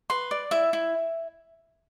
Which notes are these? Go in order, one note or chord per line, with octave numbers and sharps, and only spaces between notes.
B4 C6
D5
E4 E5
E4